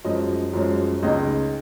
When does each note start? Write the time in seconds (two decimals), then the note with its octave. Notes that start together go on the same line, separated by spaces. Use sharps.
0.05 F#2 F3 G#3 C#4 D#5
0.53 F#2 F3 G#3 C#4
1.03 C#2 C#3 G#3 D#4 D#5